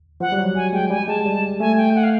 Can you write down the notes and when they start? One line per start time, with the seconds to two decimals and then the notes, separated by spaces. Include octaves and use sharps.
0.20 F3 F#5
0.32 G3
0.38 F#3
0.55 G#5
0.73 G#3 G5
0.90 G3 G#5
1.08 G#3 A5
1.25 G3
1.60 A3 G#5
1.77 G5
1.95 F#5
2.03 F5